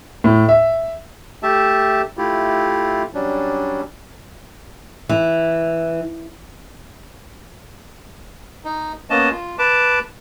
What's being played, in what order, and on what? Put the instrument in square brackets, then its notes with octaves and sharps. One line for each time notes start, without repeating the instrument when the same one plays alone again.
[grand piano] A2
E5
[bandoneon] A3 G4 E5 A5
A3 E4 F4 G4
F#3 G3 C#4 D4
[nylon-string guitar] E3
[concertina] D#4
A#3 B3 C#4 D#5 A5
F4
B4 A5 D6